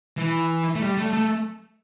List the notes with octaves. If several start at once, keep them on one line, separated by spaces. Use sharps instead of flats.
E3
A3
G3
A3
A3